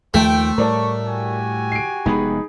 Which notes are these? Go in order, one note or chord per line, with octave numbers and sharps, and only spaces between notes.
D#2 F3 A3 C5 G5
A2 G3 A#4 D5 A5 C#6
F#4 G4 G#5
C7 D7
F1 G#3 B3 D#4 G#4 B5